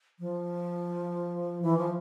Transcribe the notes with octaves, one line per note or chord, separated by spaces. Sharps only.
F3
E3
F3